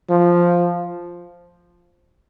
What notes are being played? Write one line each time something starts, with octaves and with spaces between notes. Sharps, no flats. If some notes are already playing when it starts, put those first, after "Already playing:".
F3